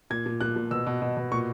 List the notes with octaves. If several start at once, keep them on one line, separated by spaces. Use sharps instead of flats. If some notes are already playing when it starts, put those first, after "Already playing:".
A#2 G#6
A#2
A#2 F#6
A#2
B2 E6
B2
B2
B2
A#2 C#6